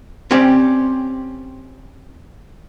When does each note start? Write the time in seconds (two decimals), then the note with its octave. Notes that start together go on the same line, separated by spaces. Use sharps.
0.31 C4 C#4 G4 C5 D5